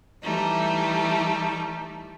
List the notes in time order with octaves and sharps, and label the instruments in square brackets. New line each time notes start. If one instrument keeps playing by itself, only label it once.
[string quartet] E3 G3 A3 D#4